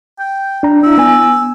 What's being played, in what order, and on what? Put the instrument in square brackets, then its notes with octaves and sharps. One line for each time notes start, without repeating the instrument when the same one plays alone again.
[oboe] G5
[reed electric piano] D4 A#5
[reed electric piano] D4 E4 [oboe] E6
[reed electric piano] B3 G#5